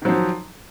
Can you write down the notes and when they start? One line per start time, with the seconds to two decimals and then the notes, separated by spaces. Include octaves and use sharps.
0.02 D#3
0.05 F#3
0.09 F3